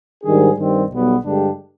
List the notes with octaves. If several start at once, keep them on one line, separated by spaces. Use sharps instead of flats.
G#2 D#3 G3 D4 G#4
G2 D#3 G3 C4 G4
B1 B2 G3 B3
G2 D3 G#3 D4 G4